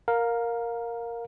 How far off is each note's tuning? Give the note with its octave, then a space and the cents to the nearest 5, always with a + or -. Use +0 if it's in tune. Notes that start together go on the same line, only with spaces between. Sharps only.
A#4 +0 F5 +20